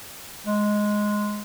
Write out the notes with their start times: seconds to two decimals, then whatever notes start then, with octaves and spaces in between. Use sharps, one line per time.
0.47 G#3